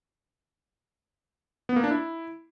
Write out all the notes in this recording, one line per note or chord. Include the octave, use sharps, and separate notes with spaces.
B3
A#3
D4
E4